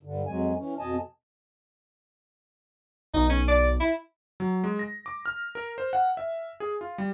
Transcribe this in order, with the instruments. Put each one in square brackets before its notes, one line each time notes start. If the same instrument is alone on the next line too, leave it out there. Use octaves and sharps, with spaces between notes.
[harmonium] G2 D3
F2 F#3 G#3 G#5
E3 C#4
F2 B2 D#5 G#5 A5
[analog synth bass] B1 [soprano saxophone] D#4
[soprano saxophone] C#4
D5
E4
[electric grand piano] F#3
G#3
A#6
D6
F6
A#4
C5
F#5
E5
G#4
F4
G3